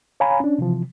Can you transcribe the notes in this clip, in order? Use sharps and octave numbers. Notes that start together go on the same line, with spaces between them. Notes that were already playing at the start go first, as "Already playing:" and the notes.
C#5 F5 G#5 A#5 B5
C#4 D4
C3 E3 F3